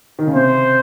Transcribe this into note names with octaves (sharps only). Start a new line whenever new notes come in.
D#3
C#3
C3 C5